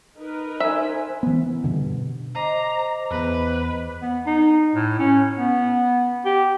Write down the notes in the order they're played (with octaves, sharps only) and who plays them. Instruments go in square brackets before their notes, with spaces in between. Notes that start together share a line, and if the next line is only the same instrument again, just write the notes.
[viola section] D#4 A#4 B4
[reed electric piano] C5 G#5 [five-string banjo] E5
[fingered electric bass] E3 B3
G2 B2 D3
[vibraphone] C5 D#5 D6 [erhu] A#5
[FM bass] E2 [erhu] B4
[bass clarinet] B3
D#4
A2
C#4
B3
G4